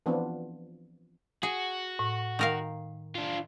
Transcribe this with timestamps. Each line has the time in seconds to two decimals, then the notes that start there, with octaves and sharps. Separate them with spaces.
0.06 E3 F3 B3 C4 D4 F4
1.43 F#4 G#4
1.99 A2
2.39 D#3 A#4 F5
3.15 D4 F4